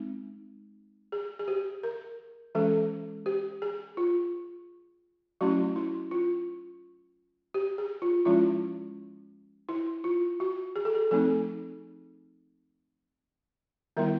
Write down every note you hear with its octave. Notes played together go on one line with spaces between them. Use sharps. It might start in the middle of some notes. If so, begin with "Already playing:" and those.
Already playing: G#3 C4 D#4
G#4
G#4
G4
A#4
E3 G#3 C#4 A4
G4
G#4
F4
F#3 A3 C#4 E4 F#4
E4
F4
G4
G#4
F4
F3 G#3 C#4 E4 F4
E4
F4
F#4
G#4
A4
G#4
F3 A3 C4 D#4 A4
D#3 G3 B3 E4 A#4